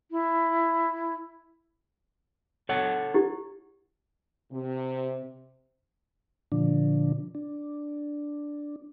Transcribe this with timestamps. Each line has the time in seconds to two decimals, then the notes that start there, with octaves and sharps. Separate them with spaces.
0.11 E4
2.69 A4 C#5 F#5
3.14 E4 G4
4.51 C3
6.52 A#2 D3 F3 D4
7.35 D4